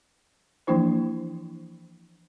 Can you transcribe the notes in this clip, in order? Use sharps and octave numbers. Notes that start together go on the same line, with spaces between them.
E3 F3 A#3 D4 E4 C5